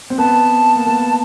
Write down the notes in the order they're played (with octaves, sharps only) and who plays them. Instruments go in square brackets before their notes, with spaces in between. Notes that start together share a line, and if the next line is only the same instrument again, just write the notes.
[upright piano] C4
[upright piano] B3 [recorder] A5
[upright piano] A#3
B3